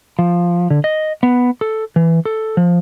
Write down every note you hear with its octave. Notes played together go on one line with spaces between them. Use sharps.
F3
D3
D#5
B3
A4
E3
A4
F3